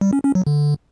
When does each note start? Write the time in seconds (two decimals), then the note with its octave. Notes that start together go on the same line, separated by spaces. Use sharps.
0.01 G3
0.13 C#4
0.24 C#4
0.35 F#3
0.47 D3